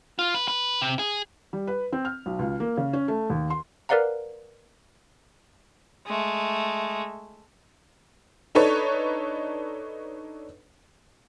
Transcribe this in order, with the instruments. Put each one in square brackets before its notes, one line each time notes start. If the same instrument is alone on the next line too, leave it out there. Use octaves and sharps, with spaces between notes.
[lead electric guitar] F4
B4
B4
C3
G#4
[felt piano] G3
B4
C4
F6
B1
C#2
A#3
C#3
C#4
A3
D#2
C6
[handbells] A#4 B4 D5 F5 F#5 A#5
[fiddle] G#3 A3
[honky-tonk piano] D4 D#4 A4 B4 C#5